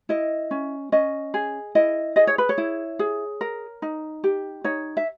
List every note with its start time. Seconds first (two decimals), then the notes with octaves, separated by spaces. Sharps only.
0.09 E4 D#5
0.51 C#4
0.92 C#4 D#5
1.34 G#4
1.75 E4 D#5
2.16 G#4 D#5
2.27 C#5
2.38 B4
2.49 C#5
2.58 E4
2.99 G#4
3.41 A#4
3.82 D#4
4.24 G4
4.64 D#4 C#5
4.97 E5